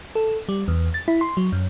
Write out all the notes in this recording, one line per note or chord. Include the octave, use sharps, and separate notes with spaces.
A4
G3
E2
A6
E4
C6
F#3
F#2